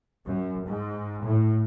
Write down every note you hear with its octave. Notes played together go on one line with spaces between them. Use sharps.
F#2
G#2
A2